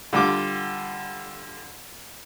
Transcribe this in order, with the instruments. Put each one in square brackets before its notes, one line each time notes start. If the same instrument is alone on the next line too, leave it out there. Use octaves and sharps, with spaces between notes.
[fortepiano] D3 G3 F4 D6